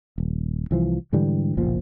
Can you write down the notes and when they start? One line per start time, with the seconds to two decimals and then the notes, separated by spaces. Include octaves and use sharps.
0.18 D#1
0.71 C2 E3 F3
1.13 G#2 D3 E3 G3
1.57 F#1 B1 A#2 F3